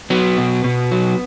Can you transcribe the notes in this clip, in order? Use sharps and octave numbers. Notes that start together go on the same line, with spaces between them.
F#3 B3
B2
B2
F#3